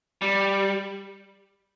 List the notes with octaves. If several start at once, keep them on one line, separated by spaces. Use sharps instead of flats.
G3